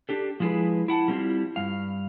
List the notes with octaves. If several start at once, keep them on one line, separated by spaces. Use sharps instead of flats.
D4 G4 A4
F3 G#3 E4 G#4 B4
E4 F#5 A5
G3 A#3 C4 C#4 E4 F4
G2 G3 F5